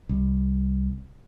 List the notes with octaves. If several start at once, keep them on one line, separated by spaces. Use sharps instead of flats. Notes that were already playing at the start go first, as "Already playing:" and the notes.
C2